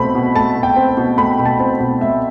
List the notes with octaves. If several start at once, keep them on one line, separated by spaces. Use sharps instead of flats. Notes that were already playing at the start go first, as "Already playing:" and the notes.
Already playing: B2 A3 C4 B5
B2
A3 A5
B2
G5
C4
B2
A3 B5
B2
A5
C4
B2
A3 E5